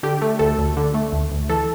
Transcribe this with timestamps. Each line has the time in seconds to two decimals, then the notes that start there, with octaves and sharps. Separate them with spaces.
0.03 D3 G4
0.22 A3
0.39 D2 A4
0.58 D2
0.77 D3
0.94 A3
1.13 D2
1.31 D2
1.49 E3 A4